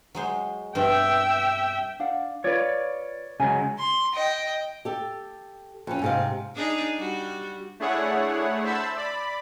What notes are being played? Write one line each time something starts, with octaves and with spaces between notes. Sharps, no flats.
F#3 G#3 C5
G2 B2 C4 E5 G5
D4 F5 F#5
F4 B4 C#5 D5
C#3 F#3 G#3 G#5
C6
D#5 G5
G4 A4
F2 C#4
G#2 C3 F5
D4 D#4 G#4
G3 F#4
A3 D4 E4 G#4 C#5 F#5
C5 E5 A5 B5 E6
D5 B5